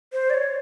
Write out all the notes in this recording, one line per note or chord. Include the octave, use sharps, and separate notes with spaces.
C5
D5
C#5